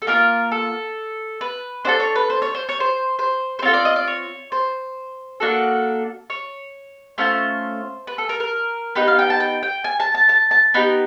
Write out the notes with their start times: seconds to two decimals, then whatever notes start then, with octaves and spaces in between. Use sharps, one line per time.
0.02 A4
0.07 A#3 D4 F4 A#4
0.52 A4
1.41 B4
1.85 D4 F#4 A4 C5
2.00 C#5
2.15 B4
2.30 C5
2.42 C#5
2.55 C5
2.69 C#5
2.80 C5
3.19 C5
3.59 C5
3.62 C4 C#5
3.65 F4 A4
3.74 D5
3.85 D#5
3.96 D5
4.07 C#5
4.52 C5
5.40 A#3 D4 F#4 A4
6.30 C#5
7.18 A3 C#4 F4 C5
8.07 B4
8.18 A4
8.29 A#4
8.40 A#4
8.95 B3 D#4 G4 B4
9.08 F5
9.19 G5
9.30 A5
9.40 G5
9.63 G5
9.84 G#5
10.00 A5
10.15 A5
10.29 A5
10.51 A5
10.74 B3 D#4 G4